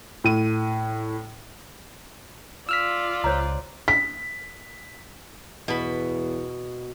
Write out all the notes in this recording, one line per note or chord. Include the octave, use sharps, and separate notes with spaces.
A2 D#7
F4 D5 E6 F6 B6
C#2 C5 C#5 A#5
B6
E2 B2 B5